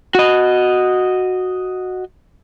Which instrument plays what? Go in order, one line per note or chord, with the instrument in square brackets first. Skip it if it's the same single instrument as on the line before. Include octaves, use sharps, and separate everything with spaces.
[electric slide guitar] F#4 D#5